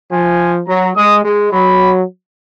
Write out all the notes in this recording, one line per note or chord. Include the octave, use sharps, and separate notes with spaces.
F3 G#5
F#3 A#5
G#3 D#6
G#3
F#3 B5